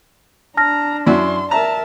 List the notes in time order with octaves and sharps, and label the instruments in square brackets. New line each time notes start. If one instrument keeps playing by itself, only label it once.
[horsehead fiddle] D4 [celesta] A5 F6 A#6 [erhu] A#5
[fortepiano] F#2 E4 F#4 [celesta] D5 [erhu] C6
[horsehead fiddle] A#4 E5 [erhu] A5 [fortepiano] A#5